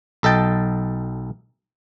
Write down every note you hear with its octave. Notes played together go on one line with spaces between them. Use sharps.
B1 A4 D#5 G5 A5